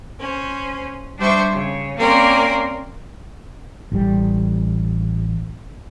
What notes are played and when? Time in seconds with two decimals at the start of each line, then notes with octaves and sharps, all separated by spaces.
0.19 C#4 C5
1.17 G3 D4 C5 E5 C#6
1.50 C#3
1.96 A#3 C4 C#4 A#4 D5 C6
3.92 A1 G3